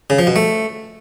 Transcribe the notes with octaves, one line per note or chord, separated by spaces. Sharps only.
C#3
F3
B2
A3